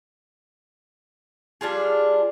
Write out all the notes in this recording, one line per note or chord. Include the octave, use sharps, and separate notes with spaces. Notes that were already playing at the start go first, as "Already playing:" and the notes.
G3 D4 F4 G#4